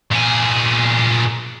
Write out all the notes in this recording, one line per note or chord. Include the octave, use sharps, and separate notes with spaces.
A#2 G#4